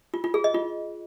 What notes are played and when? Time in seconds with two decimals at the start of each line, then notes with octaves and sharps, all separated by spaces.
0.14 F4
0.24 F4
0.34 G#4
0.44 D#5
0.54 F4